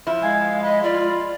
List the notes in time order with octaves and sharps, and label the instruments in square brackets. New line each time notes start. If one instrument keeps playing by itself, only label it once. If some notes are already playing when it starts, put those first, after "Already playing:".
[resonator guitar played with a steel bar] F3 E4
[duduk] G#3 [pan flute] F5 [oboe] G#5
[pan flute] D#5 [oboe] B5
[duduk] F4 [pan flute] D5